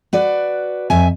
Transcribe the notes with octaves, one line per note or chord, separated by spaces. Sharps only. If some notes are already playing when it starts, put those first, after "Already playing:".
F#4 B4 D5
F2 E5 G#5